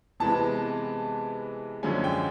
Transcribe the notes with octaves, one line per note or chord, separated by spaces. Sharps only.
C3 E3 G#3 B3 A5
F#2 D3 F3 G#3 C#4 G#5
G5